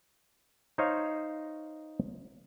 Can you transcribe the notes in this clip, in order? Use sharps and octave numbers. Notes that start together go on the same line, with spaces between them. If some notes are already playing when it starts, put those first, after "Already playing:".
D#4 C5 C#5 D#5 F5